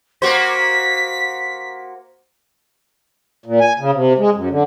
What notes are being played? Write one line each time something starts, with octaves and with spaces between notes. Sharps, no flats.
A#3 F#4 C5 B6
A#2
G#5
C#3
C3
G#3
F#2
D3